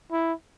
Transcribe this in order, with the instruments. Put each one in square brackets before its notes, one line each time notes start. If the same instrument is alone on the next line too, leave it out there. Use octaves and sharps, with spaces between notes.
[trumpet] E4